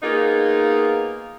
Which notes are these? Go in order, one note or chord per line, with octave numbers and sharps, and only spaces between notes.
A#3 B3 D#4 F4 G#4